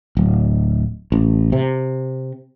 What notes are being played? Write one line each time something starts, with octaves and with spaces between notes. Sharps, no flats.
D1
A1
C3